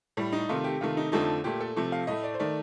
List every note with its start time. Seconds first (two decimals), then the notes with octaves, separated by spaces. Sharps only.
0.17 A2 G3
0.32 D#4
0.49 C3 D#3 A3 F4
0.64 G4
0.81 C3 D#3 A3 F4
0.97 D#4
1.12 F2 D3 F3 A3 D#4
1.44 A#2 A3 G4
1.61 A4
1.76 C3 F3 A3
1.92 F5
2.07 A2 A3 D#5
2.24 D5
2.34 C5
2.39 D#3 A3 D5